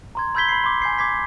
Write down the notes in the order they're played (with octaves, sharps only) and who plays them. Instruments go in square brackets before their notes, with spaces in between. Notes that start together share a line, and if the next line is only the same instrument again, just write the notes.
[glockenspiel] A#5 C6 G#6
B5 E6 G6 G#6 B6 G7
B5 C7
C6 D6
G#5 G6 C7
D6 G#6 B6